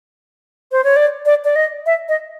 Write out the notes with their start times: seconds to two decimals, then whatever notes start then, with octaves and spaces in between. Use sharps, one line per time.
0.72 C5
0.84 C#5
0.96 D5
1.25 D5
1.44 D5
1.56 D#5
1.86 E5
2.09 D#5